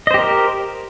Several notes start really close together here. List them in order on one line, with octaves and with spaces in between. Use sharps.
D#5 C5 G4 A#4